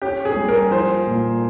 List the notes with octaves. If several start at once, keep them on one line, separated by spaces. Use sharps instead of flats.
C#4 G4
G#4
G3
A#4
F3 C5
A#2